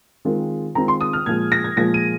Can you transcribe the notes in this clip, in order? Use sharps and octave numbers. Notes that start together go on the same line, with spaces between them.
D#3 G#3 C4 F4
D#3 G#3 C4 F4 A#5
C6
D#6
F6
A#2 F3 G#3 G#6
A#6
G#6
A#2 F3 G#3 A#6
D#7